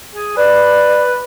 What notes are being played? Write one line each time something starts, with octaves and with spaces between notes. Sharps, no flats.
G#4
B4 D5